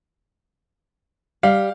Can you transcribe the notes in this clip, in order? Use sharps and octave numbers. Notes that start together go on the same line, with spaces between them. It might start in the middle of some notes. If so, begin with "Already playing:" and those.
G3 F5